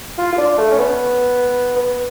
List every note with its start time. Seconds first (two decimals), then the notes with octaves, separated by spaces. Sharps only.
0.18 F4
0.32 F4
0.38 D4
0.58 A3
0.71 C#4
0.78 B3
1.76 B3